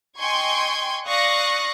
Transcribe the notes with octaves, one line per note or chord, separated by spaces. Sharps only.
D#5 G5 G#5 C6 C#6 G#6
D5 F5 C#6 D#6 F#6 A#6